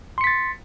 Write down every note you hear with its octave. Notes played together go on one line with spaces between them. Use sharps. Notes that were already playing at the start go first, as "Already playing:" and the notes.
C6 A6 B6 C#7